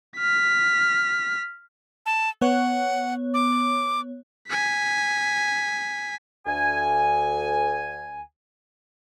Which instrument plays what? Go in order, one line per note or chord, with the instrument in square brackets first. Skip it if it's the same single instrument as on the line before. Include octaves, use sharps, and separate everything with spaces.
[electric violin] F6 B6
[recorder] A5
[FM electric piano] B3 C#5 [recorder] F#5
[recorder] D6
[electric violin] G#5 B6
[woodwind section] D2 G#5